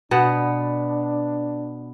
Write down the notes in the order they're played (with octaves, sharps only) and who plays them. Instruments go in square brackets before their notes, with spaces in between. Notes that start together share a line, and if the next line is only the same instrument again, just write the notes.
[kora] B2 B3 F#5 [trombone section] D4